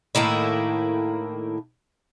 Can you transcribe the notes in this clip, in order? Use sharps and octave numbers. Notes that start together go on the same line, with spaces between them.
A2 D#3 A#3 E4